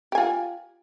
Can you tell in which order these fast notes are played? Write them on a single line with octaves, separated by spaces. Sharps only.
G4 G#5 F4